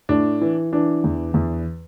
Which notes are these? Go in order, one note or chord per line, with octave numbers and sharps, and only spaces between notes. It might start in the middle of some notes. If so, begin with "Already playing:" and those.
A2 D4
E3
E3 D4
E2
E2